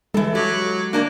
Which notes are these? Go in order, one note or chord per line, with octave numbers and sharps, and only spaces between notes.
E3 G#3 A4
F#3 G4
A#3 D4 D5 A5